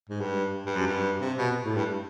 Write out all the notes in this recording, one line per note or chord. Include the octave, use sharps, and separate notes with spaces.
G#2
G2
G2
F#2
G2
C3
B2
A2
G2